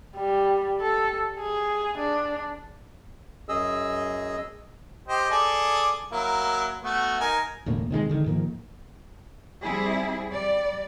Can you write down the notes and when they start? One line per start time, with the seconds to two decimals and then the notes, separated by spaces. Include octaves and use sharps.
0.17 G3
0.81 A4
1.40 G#4
1.98 D4
3.49 F#2 G#4 D#5 E6
5.08 G4 C5 D#5
5.30 G#4 A4 D5
6.12 F#3 A#3 E4
6.83 A3 B3 F#4
7.20 D#4 A#4 G#5
7.66 E1 D2 A2 A#3
7.91 C3 D#3 G3 G#3
8.09 D3 D#3
8.26 G#2 D#3 F3 A#3
9.61 G3 C4 E4 G#4
10.30 G3 D5